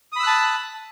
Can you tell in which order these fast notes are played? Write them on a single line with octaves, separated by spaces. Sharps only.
D#6 B5 E6 F#6 A5